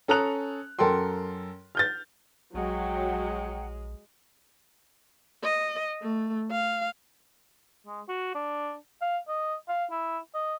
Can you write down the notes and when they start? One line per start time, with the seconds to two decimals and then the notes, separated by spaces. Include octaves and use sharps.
0.08 C#4 A4 A#5 D#6 F#6 F7
0.79 F#2 A4 A#4 G5 C6
1.75 F6 G6 A6
2.54 A#1 F#3 G#3 F#5 G5
5.43 D#5
6.02 A3
6.52 F5
7.86 G#3
8.08 F#4
8.35 D4
9.02 F5
9.28 D#5
9.68 F5
9.91 E4
10.34 D#5